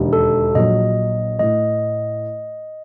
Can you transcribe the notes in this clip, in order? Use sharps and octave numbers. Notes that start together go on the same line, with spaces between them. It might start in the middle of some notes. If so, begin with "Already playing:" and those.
Already playing: E1 D#2 D3
A4
A#1 A#2 F#3 D#5
A2 D#5